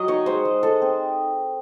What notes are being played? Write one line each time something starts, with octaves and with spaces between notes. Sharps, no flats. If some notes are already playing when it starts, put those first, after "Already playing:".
Already playing: F#3 D#5
D#4 C#5
G#3 C5
G#3
G#3 A4
C4